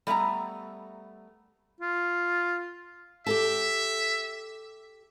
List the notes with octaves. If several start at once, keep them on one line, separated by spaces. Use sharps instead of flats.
G3 A3 B3 F5 A#5
F4
G4 A4 E5 A5